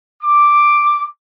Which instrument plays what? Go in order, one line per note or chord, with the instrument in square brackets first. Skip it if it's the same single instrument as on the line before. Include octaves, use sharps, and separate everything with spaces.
[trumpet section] D6